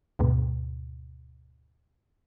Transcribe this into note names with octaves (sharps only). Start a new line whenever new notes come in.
D2 G#2 B2